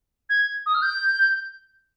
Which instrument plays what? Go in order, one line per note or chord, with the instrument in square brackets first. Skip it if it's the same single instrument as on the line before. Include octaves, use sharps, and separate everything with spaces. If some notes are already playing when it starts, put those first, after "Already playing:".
[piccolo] G#6
D#6
F6
G6